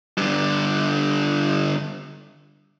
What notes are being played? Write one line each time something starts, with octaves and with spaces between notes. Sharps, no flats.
G2 D3